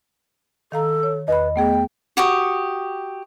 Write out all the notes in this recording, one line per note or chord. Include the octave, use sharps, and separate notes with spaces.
D#3 A4 F5 A#5
C#5
E2 B4 D#5 B5
A3 B3 G#4 G5
F#4 G4 C#6 D#6